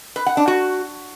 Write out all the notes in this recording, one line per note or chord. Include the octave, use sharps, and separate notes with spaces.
B4
F#5
D4
F#4